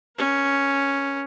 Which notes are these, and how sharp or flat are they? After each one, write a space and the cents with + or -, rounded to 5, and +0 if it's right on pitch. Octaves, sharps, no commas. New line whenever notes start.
C#4 +0 A#4 +30